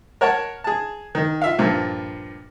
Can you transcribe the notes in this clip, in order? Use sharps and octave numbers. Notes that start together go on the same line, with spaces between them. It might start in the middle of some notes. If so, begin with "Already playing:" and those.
A#4 C#5 F#5 A5
G#4 A5
D#3
F4 E5 F5
G2 A#2 F3